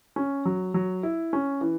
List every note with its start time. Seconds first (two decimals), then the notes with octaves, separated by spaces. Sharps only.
0.16 C#4
0.45 F#3
0.74 F#3
1.03 E4
1.33 C#4
1.61 E3